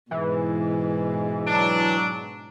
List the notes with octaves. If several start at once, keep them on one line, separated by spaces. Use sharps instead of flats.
G#2 B2 E3
F#3 D4